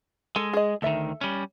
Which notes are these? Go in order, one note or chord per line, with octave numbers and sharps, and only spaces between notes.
G#3 A4
G#4 D#5
D2 D#3 A4 E5
G3 C#4